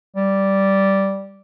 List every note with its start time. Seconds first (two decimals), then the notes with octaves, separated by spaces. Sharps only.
0.16 G3